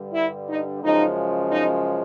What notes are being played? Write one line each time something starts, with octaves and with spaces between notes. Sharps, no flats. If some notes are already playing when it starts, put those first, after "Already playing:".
Already playing: G2 D3 G3
E4
D#4
F#2 C#3 F3 G#3 D#4
D#4